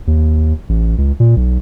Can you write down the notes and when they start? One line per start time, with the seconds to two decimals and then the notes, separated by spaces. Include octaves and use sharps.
0.07 D#2
0.69 A1
0.98 C#2
1.20 A#2
1.36 B1